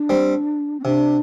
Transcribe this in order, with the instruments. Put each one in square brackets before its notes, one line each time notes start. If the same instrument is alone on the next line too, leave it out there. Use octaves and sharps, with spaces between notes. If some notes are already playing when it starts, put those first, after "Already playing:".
Already playing: [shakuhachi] D4
[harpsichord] G3 C4
[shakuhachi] C4
[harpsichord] C3 [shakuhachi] D4